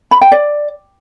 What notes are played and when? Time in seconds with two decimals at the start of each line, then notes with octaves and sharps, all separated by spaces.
0.11 B5
0.21 G5
0.32 D5